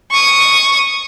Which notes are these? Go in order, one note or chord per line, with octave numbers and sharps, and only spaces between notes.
C#6 D#6